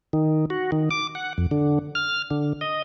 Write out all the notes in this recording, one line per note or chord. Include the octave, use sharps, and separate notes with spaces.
D#3
F#4
D#3
D6
F#5
F2
D3
F6
D3
D#5